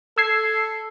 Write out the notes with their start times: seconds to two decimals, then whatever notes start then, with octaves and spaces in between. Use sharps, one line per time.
0.18 A4 E6 G#6 C7